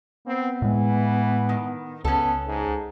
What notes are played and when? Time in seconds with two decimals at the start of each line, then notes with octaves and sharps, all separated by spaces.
0.27 B3 C4
0.62 A2 E3 G#3
1.49 D#3
2.05 C#2 B3 C#4 A4
2.47 G#2